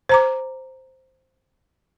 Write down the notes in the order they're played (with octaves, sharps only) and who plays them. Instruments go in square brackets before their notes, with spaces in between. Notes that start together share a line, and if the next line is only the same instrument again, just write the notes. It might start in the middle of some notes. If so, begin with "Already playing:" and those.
[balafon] C5 A#5 D6